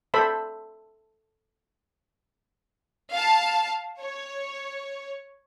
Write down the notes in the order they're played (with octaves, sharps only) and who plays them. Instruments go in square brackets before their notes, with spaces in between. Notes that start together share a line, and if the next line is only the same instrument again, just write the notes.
[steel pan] A4 C5 E5 B5
[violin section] F5 A5
C#5